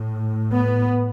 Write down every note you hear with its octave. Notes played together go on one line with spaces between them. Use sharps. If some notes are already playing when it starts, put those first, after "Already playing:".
Already playing: A2
B3